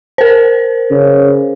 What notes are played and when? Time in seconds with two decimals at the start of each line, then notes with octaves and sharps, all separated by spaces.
0.18 A#4 C5
0.91 C#3